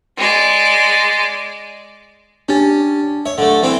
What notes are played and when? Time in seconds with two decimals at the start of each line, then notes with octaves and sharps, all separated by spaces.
0.17 G#3 D5
2.49 C#4 D4 G4 A6
3.26 C#5 E5
3.38 D3 A3
3.63 E3 C4 E4